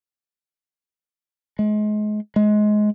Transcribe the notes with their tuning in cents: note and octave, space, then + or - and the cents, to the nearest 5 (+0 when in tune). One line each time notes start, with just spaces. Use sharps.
G#3 +30
G#3 +20